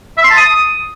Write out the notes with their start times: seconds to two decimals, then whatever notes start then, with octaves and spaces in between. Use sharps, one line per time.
0.18 E5
0.24 C6
0.30 A5
0.37 D#6